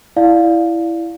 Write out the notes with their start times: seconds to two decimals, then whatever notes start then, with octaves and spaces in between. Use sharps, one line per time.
0.17 E4 D5 F5